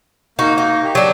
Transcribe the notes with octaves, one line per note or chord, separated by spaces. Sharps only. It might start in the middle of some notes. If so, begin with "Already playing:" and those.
A#3 D#4 F#4
D#4
G4
F#3 D4